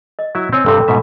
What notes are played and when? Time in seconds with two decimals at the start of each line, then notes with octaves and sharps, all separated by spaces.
0.19 D#5
0.35 F#3 E4 E5
0.53 C4 C#5 G#5 E6
0.66 G2 C3 C4 A4
0.88 G#2 B2 E5